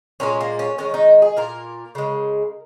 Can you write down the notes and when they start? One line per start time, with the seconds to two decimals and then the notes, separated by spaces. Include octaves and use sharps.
0.20 A#2 G#3 C#4
0.41 A#3
0.59 C#4
0.78 D#3 G#3 C#4
0.94 D#4
1.22 G#4
1.37 A#2 A#3 A#4
1.95 C#3 G#3